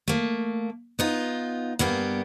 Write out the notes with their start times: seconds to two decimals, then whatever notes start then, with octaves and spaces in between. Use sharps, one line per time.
0.08 A3 A#3
0.99 B3 D#4 F4
1.79 G2 A#3 B3 G4